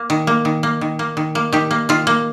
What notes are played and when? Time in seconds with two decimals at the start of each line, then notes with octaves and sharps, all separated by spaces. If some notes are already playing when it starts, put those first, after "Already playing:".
Already playing: A#3
0.10 D#3
0.27 A#3
0.45 D#3
0.63 A#3
0.81 D#3
0.99 A#3
1.17 D#3
1.35 A#3
1.53 D#3 G4
1.71 A#3
1.89 D#3 F4
2.07 A#3